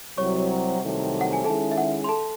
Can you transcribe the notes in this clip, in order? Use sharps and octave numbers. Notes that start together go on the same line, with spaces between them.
C2 C3 F#3 C#5 C#6
C2 C3 D#3 F#3 A3
F#5
G#5
D#3 G#3 C#4 E4 G#4 A4 A5
E5
F#5
C6
A4 A5